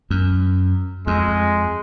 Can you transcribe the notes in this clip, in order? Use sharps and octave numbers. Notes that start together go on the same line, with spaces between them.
F#2
F2 G#3